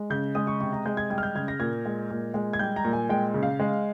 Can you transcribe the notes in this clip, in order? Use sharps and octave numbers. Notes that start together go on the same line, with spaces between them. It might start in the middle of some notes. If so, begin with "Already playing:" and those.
Already playing: G#3
C#3 G6
G#3 D#6
C#6
C3 C#6
A#5
G#3 G6
G#6
G3 G#6
F6
G6
C#3 G#6
A#6
A#2 G#6
G#3
A#2
G#3
G#6
G3 G6
A#5
A#2
G#5
G#3 G5
C#3
F5
G#3